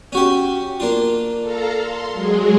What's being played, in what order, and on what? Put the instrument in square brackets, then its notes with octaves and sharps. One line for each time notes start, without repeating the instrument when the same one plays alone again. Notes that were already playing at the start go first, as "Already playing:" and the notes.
[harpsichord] C#4 F#4 G4
A#3 D4 F4
[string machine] A4 F5 A#5
C6
F#3 G#3 G#4